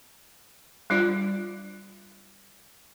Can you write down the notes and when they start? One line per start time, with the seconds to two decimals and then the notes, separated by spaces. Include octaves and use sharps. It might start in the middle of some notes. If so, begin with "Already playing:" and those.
0.90 G3 D4 F4 D5